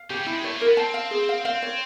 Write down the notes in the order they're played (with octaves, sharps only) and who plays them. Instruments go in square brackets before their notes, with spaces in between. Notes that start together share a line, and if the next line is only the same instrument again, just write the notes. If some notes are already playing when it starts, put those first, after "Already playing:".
Already playing: [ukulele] F5
[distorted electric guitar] C#3 [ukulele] G4
[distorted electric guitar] G3 [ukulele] E4
[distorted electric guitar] G#3
[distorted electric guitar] A3 [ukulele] C#5
[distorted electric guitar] A#3
[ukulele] A#4
[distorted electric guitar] B3
[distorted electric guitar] C4 [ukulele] A5
[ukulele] F5
G#4
F5
[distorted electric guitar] C4 [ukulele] F5
[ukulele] C#5